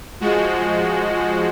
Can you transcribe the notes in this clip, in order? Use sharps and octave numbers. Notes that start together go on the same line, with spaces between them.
F3 G#3 F#4